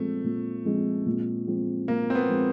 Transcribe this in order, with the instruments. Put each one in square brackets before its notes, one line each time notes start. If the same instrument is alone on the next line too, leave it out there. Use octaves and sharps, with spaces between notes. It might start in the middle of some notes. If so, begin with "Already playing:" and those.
Already playing: [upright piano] A#2 F3 G#3 C4 [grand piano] A3
[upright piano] A#2
F3 G#3 C4
A#2
F3 G#3 C4
[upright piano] A#2 [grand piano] A#3
[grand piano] C4
B3
[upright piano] F3 G#3 C4